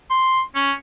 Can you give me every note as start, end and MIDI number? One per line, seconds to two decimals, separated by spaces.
0.10 0.41 84
0.55 0.72 61